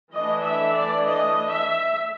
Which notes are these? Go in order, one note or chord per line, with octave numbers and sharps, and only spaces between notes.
E3 A3 D4 D#5
E5
D5
D#5
E5